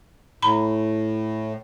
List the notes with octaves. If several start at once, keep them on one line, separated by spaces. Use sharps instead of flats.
A2 A#5 B5